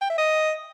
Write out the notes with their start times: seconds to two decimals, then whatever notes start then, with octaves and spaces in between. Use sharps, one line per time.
0.02 G5
0.10 E5
0.18 D#5